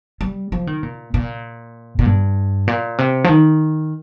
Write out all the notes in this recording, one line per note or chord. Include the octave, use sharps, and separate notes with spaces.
G3
F3
D#3
A#2
A#2
A#2
G2
A#2
C3
F3
D#3